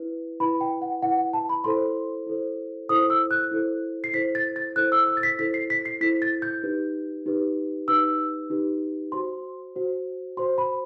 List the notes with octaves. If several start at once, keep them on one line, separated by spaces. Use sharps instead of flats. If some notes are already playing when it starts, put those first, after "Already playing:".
Already playing: E4 B4
E4 B4 B5
G5
F#5
E4 B4 F#5
F#5
A5
B5
E4 A4 C5 C6
E4 A4 C5
E4 A4 C5 D#6
E6
F#6
E4 A4 C5
C7
E4 A4 C5 B6
A6
A6
E4 A4 C5 F#6
E6
E6
A6
B6
E4 A4 C5 B6
C7
B6
C7
E4 A4 C5 B6
A6
G6
D#4 G4 B4
D#4 G4 B4
D#4 G4 B4 E6
D#4 G4 B4
F#4 C5 C6
F#4 C5
F#4 C5 C6
B5